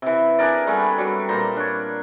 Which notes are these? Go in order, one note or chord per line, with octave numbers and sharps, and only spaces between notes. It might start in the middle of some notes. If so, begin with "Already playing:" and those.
C3 E3
D4 G#4 A#4 D5
G3 A3 B3 G#4
F#3 G3
A#2 G3 C5 A#5
D4 C#5